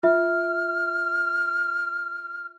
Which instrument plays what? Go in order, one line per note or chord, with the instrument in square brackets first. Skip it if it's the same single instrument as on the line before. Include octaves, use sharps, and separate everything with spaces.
[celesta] F4 E5 [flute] F6